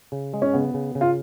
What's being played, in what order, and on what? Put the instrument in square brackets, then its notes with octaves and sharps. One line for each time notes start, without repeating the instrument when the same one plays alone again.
[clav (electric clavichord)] C#3
G#3
[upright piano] C#4
[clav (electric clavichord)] C#3 [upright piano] B3
[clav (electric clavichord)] C#3
C#3
[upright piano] F4